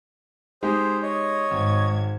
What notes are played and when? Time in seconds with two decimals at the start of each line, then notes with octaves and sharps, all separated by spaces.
0.63 G#3 D#4 G4 G#4 C5
1.03 C#5 D#5
1.51 G#1 G#2 G#6